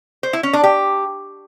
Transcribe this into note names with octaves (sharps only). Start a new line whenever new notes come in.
C5
E4
C#4
D4
G4